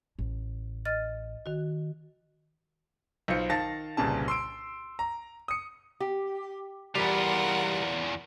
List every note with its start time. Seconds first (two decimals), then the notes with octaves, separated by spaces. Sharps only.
0.19 A1
0.85 D#5 F6 A6
1.46 D#3 F#4
3.28 B1 F4 C5 C#7
3.50 D#3 F5 A5 A6 A#6
3.97 G1 C2 A#2 C#3 A5
4.28 C6 E6 D7
4.99 A#5
5.48 D#6 C#7
6.00 G4
6.95 E2 E3 G3 F4 A#4 F#5